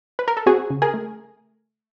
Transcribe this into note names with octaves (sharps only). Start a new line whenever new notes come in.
B4
A#4
A4
C4 F#4 G#4
C#3
G#4 A#4
A3